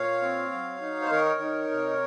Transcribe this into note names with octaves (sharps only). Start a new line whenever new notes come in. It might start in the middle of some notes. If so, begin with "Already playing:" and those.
Already playing: A#2 C#5 F5
C4
F#3
D#4
C5
D#3 A#4 C#5
D#4
C3